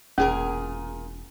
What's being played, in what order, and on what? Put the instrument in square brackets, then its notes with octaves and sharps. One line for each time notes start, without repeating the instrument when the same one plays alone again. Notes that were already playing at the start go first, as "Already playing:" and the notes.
[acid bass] E1 [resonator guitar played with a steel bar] A#2 G#4 A#4 [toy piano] C#4